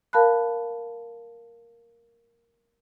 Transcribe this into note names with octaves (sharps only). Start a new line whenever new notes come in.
A#4 F5 A5 B5 F#6